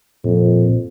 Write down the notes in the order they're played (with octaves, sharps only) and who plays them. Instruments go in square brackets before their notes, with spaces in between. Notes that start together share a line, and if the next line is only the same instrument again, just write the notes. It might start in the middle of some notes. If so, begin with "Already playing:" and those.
[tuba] F2 [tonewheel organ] A#2